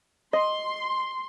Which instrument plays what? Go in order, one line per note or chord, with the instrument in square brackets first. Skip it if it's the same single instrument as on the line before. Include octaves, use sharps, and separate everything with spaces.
[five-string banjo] D#5 [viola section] C6